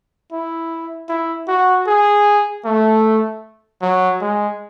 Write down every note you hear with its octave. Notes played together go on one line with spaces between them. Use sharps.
E4
E4
F#4
G#4
A3
F#3
G#3